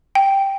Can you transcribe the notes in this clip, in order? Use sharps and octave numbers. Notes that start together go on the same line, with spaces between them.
G5